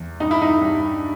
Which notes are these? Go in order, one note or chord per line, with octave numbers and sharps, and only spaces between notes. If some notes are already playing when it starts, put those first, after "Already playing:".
Already playing: E2
G2 D#4
E4
D#4
G2